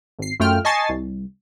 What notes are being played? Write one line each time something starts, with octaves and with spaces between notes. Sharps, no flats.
G#1 C7
F#2 A3 F4 G5 F6
D#5 G#5 A5 C#6 A6 C7
C2